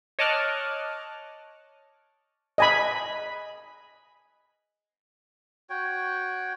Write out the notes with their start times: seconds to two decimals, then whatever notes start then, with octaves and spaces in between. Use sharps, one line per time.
0.19 C#5 D#5 A5 D6 F6 F#6
2.58 D#5 G#5 B5
5.70 F#4 C#5 G5